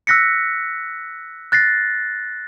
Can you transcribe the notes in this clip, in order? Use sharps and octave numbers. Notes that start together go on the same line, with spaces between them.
E6 F#6 A#6 B6 C#7
F#6 A6 A#6 C7